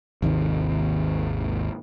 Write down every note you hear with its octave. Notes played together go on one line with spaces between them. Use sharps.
G#1 D#2 C3 D#3